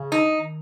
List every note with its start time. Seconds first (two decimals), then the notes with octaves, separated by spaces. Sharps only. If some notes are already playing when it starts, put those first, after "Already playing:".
Already playing: C#3
0.12 D#4
0.37 D#3